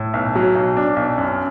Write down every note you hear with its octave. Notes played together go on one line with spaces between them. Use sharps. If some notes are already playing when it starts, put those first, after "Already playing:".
Already playing: A2
B1
F#3
B1
D4
B1
F#2